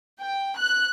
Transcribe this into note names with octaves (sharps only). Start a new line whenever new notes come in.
G5
F#6